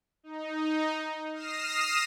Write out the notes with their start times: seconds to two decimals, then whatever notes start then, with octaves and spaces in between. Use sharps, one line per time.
0.23 D#4
1.33 D#6 F6 A#6 C7 E7